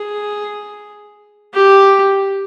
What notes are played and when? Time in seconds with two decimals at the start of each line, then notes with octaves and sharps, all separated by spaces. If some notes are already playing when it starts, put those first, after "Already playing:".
Already playing: G#4
1.54 G4